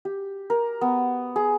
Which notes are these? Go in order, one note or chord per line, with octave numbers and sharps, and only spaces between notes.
G4
A#4
B3
G#4